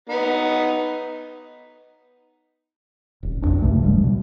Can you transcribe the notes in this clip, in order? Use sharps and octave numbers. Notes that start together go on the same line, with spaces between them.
B3 D#4
D#1 G#1
B1 F2 D4
C2 G2 C#3 A3
D#1 F3 G3 G#3
B2